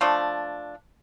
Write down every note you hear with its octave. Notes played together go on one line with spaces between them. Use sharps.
F3 A3 D4